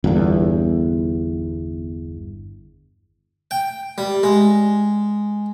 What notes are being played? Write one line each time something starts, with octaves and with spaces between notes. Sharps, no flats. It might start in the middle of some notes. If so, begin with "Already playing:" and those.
G1 E2
G5
G3
G#3